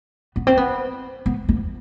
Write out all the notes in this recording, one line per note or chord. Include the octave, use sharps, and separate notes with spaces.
B3
C4
B3
B3
A#3